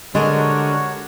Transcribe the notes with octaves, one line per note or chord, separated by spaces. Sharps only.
D3 G3 G#3 D4 F#4 A#4 C#5